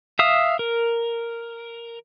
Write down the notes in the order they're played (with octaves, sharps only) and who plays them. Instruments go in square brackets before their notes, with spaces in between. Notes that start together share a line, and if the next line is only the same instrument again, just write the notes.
[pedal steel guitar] E5 F5 D#6
A#4